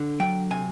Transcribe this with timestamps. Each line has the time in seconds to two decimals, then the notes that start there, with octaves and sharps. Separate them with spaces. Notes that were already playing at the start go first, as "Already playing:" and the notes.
Already playing: D3
0.20 F#3 G5
0.51 C3 G#5